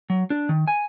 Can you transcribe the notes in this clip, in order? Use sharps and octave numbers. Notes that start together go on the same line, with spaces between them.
F#3
D4
D#3
G#5